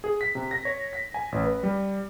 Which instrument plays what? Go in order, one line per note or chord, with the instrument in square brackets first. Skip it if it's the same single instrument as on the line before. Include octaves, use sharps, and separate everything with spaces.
[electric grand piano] G#4
B6
C3
A#6
C#5
B6
G#5
A1
B4
G3